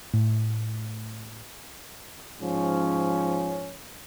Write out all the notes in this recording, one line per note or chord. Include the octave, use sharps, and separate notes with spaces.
A2
G#2 F3 C#4